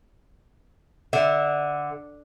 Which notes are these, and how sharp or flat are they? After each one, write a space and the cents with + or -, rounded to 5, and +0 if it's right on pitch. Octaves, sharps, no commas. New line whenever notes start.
D3 +0 E5 -15